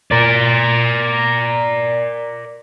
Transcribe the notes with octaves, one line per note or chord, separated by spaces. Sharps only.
A#4 D5